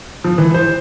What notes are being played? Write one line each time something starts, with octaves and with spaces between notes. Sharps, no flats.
F3
E3
C5